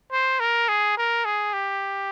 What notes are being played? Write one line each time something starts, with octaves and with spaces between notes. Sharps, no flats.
C5
A#4
G#4
A#4
G#4
G4